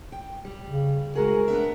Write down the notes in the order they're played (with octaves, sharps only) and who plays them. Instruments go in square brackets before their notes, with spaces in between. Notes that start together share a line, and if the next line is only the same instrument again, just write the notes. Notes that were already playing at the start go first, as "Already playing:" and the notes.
[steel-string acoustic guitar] G5
G3
[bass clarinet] C#3
[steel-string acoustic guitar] G#3 F#4 G#4 [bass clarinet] A#4
[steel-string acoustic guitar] B3 D4 E5